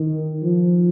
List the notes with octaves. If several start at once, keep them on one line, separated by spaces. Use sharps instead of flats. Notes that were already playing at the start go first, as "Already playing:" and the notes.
Already playing: D#3
F3